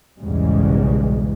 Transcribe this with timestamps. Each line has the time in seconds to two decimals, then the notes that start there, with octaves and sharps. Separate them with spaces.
0.18 B1 E2 G#2 C#3 G3 G#3